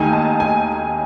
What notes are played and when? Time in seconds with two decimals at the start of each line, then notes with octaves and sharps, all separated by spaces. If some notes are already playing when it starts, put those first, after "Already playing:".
Already playing: D#2 D#3 A3 D#4 G#5
0.13 A5
0.40 G#5